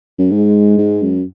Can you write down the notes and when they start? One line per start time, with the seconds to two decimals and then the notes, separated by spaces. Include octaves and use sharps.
0.18 F#2
0.31 G#2 G#3
0.78 G#2
1.02 F#2